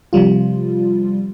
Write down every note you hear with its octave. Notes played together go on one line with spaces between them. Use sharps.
C3 F3 G3 F4